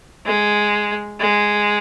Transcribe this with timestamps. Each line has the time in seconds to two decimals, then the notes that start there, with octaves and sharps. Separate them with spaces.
0.26 G#3
1.20 G#3